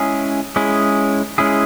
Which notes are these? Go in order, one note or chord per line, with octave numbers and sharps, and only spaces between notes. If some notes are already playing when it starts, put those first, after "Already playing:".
Already playing: G#3 C#4 E4 G#4
G#3 C#4 E4 G#4
G#3 C#4 E4 G#4